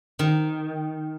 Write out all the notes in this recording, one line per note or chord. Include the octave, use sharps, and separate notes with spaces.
D#3